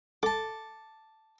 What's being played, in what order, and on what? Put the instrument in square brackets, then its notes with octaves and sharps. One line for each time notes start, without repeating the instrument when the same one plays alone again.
[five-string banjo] A4 [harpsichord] A5 D6